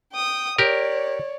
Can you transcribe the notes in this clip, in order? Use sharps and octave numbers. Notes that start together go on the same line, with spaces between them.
G5 D#6
G4 A#4 C#5 D5